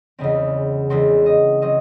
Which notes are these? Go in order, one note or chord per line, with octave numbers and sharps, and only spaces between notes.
E2 C#3 G#3 C4 D#5
E2 C#3 G#3 C4 C5
D#5
F#3 C4 D#5